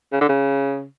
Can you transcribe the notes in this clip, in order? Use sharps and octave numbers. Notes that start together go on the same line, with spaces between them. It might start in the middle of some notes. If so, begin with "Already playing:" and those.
C#3
D3
C#3